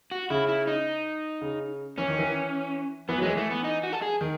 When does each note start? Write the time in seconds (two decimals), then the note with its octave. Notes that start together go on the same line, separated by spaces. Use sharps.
0.11 F#4
0.30 C#3 E4
0.49 E4
0.67 D#4
1.42 C#3
1.98 E3 C#4
2.08 D#3
2.19 E3
3.09 E3 B3
3.18 F#3
3.22 E3 G#3
3.37 A3
3.51 B3
3.64 D#4
3.83 F#4
3.93 A4
4.02 G#4
4.21 D#3